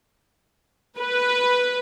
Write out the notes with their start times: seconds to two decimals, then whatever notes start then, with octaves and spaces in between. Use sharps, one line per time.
0.99 B4